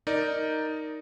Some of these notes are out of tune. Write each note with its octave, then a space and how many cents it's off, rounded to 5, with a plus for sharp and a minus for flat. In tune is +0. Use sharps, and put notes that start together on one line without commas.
D#4 +0 A#4 -5 D5 +0